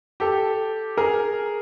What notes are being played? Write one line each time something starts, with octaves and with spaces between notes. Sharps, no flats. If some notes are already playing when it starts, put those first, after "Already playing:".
G4 A4
G#4 A#4